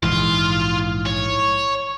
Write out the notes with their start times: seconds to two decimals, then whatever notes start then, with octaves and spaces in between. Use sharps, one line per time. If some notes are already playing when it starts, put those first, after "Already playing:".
0.03 A#1 G#2 E3 F4
1.06 C#5